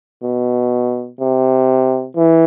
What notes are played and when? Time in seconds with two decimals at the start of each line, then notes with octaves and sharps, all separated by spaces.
0.23 B2
1.20 C3
2.16 E3